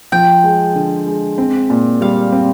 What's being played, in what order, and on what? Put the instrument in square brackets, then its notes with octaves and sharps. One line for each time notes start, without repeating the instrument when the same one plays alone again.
[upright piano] F3 [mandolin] G5
[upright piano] G#3
D3
G#3
C4
A#2
[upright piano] G3 [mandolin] F5
[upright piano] C4